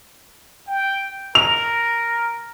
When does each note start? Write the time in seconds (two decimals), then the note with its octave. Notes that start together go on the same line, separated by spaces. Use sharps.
0.67 G5
1.35 A#4 F7